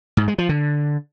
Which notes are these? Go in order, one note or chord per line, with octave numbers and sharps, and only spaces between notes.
G#2
G#3
F3
D3